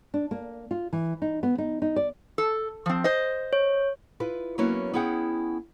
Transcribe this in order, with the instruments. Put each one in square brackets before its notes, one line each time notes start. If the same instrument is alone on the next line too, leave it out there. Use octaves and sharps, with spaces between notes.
[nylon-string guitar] D4
A#3
F4
E3
D#4
B3
D#4
D#4
D5
[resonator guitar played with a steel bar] A4
F3 C4
C5 D#5
[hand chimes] C#5
[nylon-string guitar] E4 F4 B4
F#3 A#3 B3 C#4 E4 F#4
B3 C#4 E4 G#4 F#5 G5